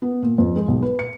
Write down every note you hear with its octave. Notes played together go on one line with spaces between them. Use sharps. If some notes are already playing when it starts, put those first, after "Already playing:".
B3
A#2
F2
G#3
B1
B4
C#7